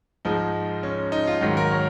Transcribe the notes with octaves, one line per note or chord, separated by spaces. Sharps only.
G#2 F3 G#3 D#4
C#4
D#4
F4
G#2 D#3 F#3
A#4
C#5